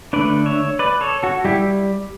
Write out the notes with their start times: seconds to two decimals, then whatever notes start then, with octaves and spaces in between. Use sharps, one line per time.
0.13 D3 A3 D4 B4 D5
0.46 C#5 E5
0.79 B4 D5
1.01 A4 C#5
1.23 F#4 A4
1.45 G3 E4 G4